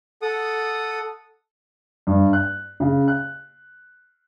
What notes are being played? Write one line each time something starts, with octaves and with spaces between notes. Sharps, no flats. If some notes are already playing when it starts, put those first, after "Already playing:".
A4 F#5 D#6
G2
F#6
C#3
F#6